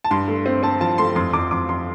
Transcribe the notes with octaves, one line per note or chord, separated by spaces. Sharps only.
A5
G2 C6
A3
C4
C4 A5
F3 A5
A3 C6
F2 C6
F2 D6
F2 D6
F2 C6